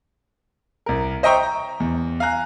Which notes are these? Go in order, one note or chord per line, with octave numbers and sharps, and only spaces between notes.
C2 A#4
C5 D#5 E5 G5 A#5 C#6
A#5
E2
F5 G#5 A#5 F#6